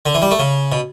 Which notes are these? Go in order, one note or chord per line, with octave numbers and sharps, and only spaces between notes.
D3
E3
G3
A3
C#3
B2